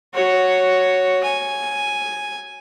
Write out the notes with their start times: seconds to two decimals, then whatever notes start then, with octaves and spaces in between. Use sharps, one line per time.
0.14 F#4 C#5
1.23 G#5